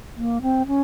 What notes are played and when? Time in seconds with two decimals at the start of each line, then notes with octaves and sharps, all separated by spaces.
0.17 A#3
0.42 C4
0.67 C#4